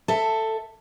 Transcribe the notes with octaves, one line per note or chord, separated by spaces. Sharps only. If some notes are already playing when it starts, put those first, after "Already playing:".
A4 E5